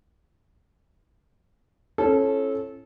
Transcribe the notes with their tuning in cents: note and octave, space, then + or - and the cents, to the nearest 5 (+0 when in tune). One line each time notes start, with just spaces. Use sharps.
C#4 -25 E4 +40 A4 -20